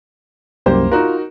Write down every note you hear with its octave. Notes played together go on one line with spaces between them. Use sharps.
C2 F#2 A#3 G4 C5
D#4 F4 F#4 A#4